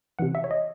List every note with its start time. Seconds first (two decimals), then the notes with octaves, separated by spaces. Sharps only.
0.19 C3 E3 F#5
0.35 E5
0.44 C#5
0.51 D#5